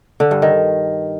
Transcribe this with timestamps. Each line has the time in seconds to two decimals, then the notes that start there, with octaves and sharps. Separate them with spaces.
0.20 D3
0.31 G2
0.42 D#3